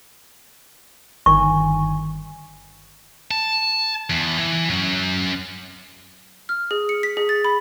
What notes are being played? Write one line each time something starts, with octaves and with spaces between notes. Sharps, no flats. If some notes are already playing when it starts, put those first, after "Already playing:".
G1 D#3 G#5 C#6
A5
E2
E3
F#3 C#4
F6
G#4
C#7
B6
G#4
A6
B5